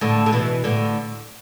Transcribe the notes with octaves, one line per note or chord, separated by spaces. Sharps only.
A2 D3
D3
B2 E3
A2 D3